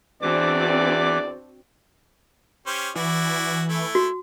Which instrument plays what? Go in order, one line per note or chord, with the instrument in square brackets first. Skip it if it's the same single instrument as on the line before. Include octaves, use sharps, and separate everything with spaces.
[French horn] E2 [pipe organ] E3 D6 [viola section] C4 D4 F#4 [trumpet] D5
[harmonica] C#4 G4 C5
[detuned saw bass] E3 [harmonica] E4 F#4 D5
[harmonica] A3 E4
[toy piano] F#4